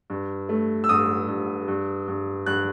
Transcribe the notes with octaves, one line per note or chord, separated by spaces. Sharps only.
G2
A3
E6
G2 D#6
G2
G2
G2
G2 F#6